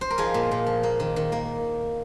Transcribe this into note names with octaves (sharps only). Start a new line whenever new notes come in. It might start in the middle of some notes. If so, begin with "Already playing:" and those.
C5
A#4
F3 D#4 G#4
A#2
A#2
F3
A#3
D#3
D#3
A#3